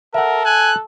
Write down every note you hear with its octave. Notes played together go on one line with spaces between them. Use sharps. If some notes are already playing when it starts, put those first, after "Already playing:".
A4 A#4 E5 F#5
G#5 F#6